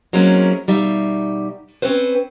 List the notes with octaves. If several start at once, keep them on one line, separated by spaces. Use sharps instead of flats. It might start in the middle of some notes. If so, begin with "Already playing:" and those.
F#3 G#3 A#3 C4 C#4 E4
B2 G3 D#4 E5 F5
C4 C#4 B4 C5